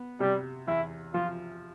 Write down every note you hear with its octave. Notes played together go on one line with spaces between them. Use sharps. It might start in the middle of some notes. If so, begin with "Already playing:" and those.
Already playing: B3
C3 G3
E2 E4
F3 F4